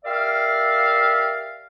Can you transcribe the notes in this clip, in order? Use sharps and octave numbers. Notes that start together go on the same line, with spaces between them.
G4 A#4 D5 E5 F5